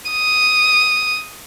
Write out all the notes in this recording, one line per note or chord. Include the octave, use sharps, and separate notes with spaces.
D#6